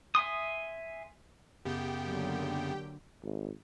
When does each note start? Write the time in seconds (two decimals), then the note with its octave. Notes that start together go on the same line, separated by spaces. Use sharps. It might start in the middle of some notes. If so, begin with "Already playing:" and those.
0.15 E5 G#5 C6 D#6
1.65 F#2 C#3 B3 G4 G5
2.04 D3 F#3 A#3
3.23 G#1